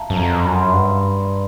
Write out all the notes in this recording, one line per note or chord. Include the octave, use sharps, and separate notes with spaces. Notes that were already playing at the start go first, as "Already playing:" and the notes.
Already playing: E5 F5 A5 A#5
F#2
F2 A#5
F#2 B5
C6
B5
G2 B5